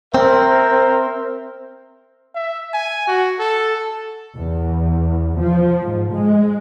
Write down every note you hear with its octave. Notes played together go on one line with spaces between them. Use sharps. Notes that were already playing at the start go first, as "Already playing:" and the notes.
C4 A#4 C5 E5
E5
G#5
F#4
A4
E2
F3
G#2
G#3